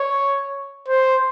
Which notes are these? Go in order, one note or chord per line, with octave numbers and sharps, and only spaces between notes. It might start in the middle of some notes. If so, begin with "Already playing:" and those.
Already playing: C#5
C5